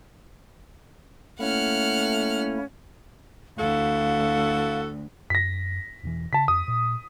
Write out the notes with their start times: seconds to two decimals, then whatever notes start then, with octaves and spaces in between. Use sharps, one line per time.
1.40 A3 A#3 C#4 E4 F#5 F6
3.58 D2 E4 F#4 A4 F5
5.30 F#2 A#6 B6
6.04 E1 E3
6.33 C#3 A5 B6
6.48 F2 D#6
6.68 A#2